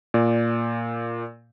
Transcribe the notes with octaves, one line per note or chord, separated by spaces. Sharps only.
A#2 D5